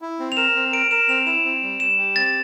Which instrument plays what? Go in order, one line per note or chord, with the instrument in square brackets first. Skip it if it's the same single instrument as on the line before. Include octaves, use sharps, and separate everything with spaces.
[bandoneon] E4
C4
[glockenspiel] F7
[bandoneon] A#4 [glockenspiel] E7
[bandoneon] C4
[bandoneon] A#4 [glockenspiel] D7
[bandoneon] A#4 [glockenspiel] E7
[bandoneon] C4 [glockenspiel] F7
[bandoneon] E4 [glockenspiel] E7
[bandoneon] C4
G3
[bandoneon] G3 [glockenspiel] E7
[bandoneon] G4
[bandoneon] C4 [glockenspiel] A6